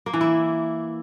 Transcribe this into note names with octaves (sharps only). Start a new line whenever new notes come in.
A#3
E3
E4